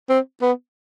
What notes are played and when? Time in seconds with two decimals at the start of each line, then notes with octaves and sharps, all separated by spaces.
0.09 C4
0.41 B3